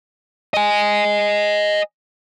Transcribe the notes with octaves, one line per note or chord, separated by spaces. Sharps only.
D#5 G#5